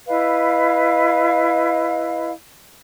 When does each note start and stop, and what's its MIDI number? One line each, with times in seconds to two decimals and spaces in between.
0.08 2.31 64
0.08 2.31 71
0.08 2.31 75
0.08 2.31 77